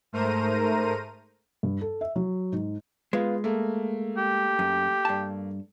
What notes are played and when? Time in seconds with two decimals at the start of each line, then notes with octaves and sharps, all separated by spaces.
0.12 G#2 A3 A#4 C5 A#5 D#7
1.63 G2
1.81 A4
2.01 E5
2.16 F#3
2.52 G#2
3.13 G#3 B3 F4
3.44 A3 A#3
4.17 G4
4.59 F#2
5.05 G2 A5